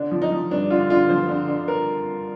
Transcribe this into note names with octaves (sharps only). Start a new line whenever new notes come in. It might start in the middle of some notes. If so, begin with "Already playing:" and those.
Already playing: D3 D4
F3
D#4
F3
G2 D4
D3 F4
D3 F4
F3 C5
D3
D3
A#4